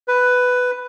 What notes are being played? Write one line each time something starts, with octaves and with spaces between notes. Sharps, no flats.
B4